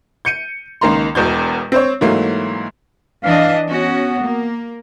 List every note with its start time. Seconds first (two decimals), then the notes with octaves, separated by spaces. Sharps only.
0.25 G6 C#7 D#7
0.81 C#2 D#3 A#3 A#5 C6
1.15 E1 E2 B2 G6
1.72 C4 C5 C#5
2.01 G#2 E3 F#3 A3 A#3
3.24 E3 D4 D#5 F5
3.67 B3 C#4 F#4
4.20 A#3